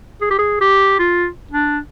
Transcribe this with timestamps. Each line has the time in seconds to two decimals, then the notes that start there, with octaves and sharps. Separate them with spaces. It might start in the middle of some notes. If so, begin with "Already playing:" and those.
0.21 G#4
0.30 G4
0.39 G#4
0.61 G4
0.99 F4
1.51 D4